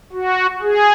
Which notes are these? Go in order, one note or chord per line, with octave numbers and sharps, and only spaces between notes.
F#4
G#4